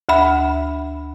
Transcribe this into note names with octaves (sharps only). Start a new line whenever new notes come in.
D2 E5 B5